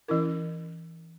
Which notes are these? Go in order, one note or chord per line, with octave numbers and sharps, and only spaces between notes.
E3 C#4 E4 A#4